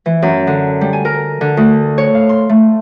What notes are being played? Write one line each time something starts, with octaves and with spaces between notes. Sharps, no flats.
E3
F#2
D3
G3
G#5
A#4
D3
D2
C#5
F5
C6
A3